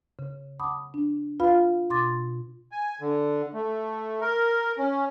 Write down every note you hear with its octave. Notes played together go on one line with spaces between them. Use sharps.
C#3
F#5 A5 B5 D6 D#6
D4
F4 B4 F5 B5
B2 C6 D6 A6
G#5
D3
A3
A#4
C#4